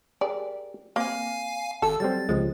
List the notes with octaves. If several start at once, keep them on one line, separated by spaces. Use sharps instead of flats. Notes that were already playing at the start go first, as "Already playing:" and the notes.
G4 G#4 A#4 D5
A#3 C4 F5 G#5
G#1 A4 E6
F#3 G3 C4 A6
C#2 F3 G#3